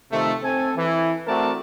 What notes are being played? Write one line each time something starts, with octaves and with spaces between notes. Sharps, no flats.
C3 D#3 F3 A3
C4 A4 G#5
E3
A3 C4 F#4 A#4 D5 A5